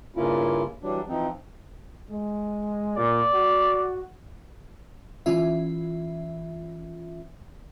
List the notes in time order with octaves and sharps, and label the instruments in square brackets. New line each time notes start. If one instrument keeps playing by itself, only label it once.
[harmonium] G2 C#3 A#3 C#4 E4 F4
E3 F#3 G3 D4
E3 F3 C4 D#4
[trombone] G#3
[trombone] A#2 [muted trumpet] D5
[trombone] F#4
[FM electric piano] E3 C#4 F4 E5